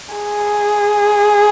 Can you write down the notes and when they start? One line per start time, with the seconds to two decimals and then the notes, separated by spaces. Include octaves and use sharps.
0.15 G#4